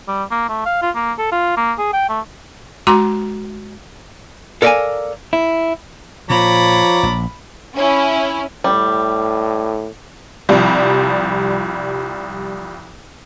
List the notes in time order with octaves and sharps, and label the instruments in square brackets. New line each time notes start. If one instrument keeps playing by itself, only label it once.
[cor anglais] G3
A#3
A3
F5
F4
A#3
A4
F4
A#3
G#4
G5
A3
[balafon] G#3 F#4 A#5 C6 D6
[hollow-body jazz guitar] A4 A#4 D5 E5 F5 G#5
E4
[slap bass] A#2 [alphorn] F3 [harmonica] C#5 D5 A#5 [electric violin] B5
[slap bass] A#1
[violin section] C#4 E4
[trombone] A2 [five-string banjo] G3
[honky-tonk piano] C2 F3 G3